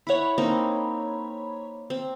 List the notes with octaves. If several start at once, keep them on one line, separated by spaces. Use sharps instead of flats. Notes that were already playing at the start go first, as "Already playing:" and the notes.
E4 C#5 F#5 B5
A#3 C4 D#4
C4